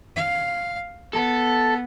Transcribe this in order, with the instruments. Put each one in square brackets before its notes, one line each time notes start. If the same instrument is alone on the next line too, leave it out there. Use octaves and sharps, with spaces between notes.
[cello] F5
[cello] B3 [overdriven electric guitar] A4